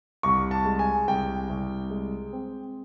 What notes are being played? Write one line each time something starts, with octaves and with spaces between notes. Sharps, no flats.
C2 C#6
A5
G#3
G#5
C2 G5
C2
G#3
C4